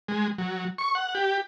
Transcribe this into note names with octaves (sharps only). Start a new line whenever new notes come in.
G#3
F#3
C#6
F#5
G4